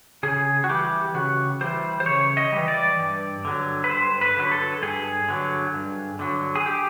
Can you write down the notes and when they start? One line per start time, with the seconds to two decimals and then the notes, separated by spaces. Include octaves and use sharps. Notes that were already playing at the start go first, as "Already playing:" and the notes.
0.23 C#3 G#4
0.64 F#4
0.69 E3 G3 G4
1.14 C#3 F#4
1.61 E3 G3 C5
2.00 C5
2.06 C#3 C#5
2.37 D#5
2.52 E3 G3
2.68 D5
2.99 G2
3.45 D3 F#3
3.84 B4
3.90 G2 C5
4.21 B4
4.37 D3 F#3
4.51 A4
4.82 G2 G#4
5.29 D3 F#3
5.74 G2
6.19 D3 F#3
6.55 G#4
6.66 G4